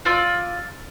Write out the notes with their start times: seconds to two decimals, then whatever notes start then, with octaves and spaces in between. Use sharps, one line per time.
0.05 F4 D5 E6